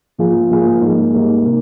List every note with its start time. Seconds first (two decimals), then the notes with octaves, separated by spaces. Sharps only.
0.19 G#2 F3 A#3 F4 G#4
0.50 G#2 F3 A#3 F4 G#4
0.82 G#2 G3 A#3 D#4
1.14 G#2 G3 A#3 D#4
1.46 C3 A#3